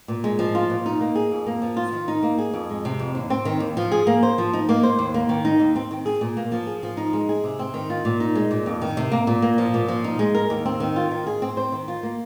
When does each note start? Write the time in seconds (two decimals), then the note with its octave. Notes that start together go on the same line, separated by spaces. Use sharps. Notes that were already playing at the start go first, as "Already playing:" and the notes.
0.08 A#2
0.24 G#3
0.39 F3
0.55 F4
0.70 A#2
0.86 D#4
1.01 A#3
1.15 G#4
1.31 F2
1.47 A#3
1.62 F3
1.77 F4
1.92 D#3
2.08 D#4
2.23 A#3
2.39 G#4
2.54 F2
2.69 G#3
2.85 C3
2.99 F2
3.15 D#2
3.30 C4
3.45 D#3
3.60 D#2
3.77 F3
3.92 G#4
4.07 A#3
4.23 C5
4.38 F3
4.53 D#4
4.69 A#3
4.83 C5
4.99 D#2
5.14 A#3
5.29 D#3
5.45 D#4
5.60 D#2
5.76 C4
5.91 D#3
6.06 G#4
6.21 A#2
6.37 A#3
6.52 F3
6.67 G#4
6.83 F3
6.97 D#4
7.13 G#3
7.29 G#4
7.44 C3
7.59 C4
7.74 D#3
7.90 F4
8.05 A#2
8.20 D#4
8.35 G#3
8.51 A#2
8.66 F2
8.82 D#3
8.97 C3
9.12 A#3
9.27 A#2
9.42 A#3
9.58 F3
9.74 A#2
9.88 F3
10.04 D#4
10.19 G#3
10.35 A#4
10.50 D#2
10.66 C4
10.80 D#3
10.96 F4
11.11 D#3
11.27 G#4
11.42 C4
11.57 C5
11.72 D#3
11.88 F4
12.03 A#3